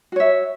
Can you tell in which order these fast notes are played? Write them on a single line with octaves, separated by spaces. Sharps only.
F#4 C#5 E5